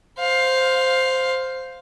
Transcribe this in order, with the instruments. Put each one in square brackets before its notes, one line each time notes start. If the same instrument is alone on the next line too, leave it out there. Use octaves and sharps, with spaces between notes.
[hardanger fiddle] C5 F5